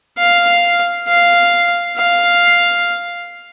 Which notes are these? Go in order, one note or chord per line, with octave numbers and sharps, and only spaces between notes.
F5
F5
F5